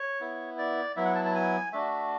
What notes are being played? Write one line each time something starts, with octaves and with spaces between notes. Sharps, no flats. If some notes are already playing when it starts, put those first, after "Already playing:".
Already playing: C#5
B3 E4
D5
F#3 B3 E4 E5
F#5
A5
A5
G#5
A3 D4 F#4 E5